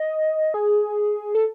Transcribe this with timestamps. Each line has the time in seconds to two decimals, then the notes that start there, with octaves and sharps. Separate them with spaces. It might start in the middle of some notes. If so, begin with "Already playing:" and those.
Already playing: D#5
0.54 G#4
1.35 A4